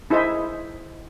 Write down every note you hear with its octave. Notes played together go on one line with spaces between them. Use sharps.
D#4 E4 G#4 C5 D#5 E5